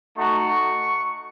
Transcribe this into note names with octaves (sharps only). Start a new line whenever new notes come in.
A3 D#4 F#4 C#6